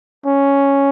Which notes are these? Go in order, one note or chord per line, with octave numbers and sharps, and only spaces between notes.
C#4